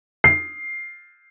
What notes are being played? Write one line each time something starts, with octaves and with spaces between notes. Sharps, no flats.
C7